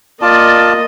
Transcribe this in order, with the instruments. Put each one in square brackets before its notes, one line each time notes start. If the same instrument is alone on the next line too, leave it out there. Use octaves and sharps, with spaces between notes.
[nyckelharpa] A#3 D#5 [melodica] F4 D5 A5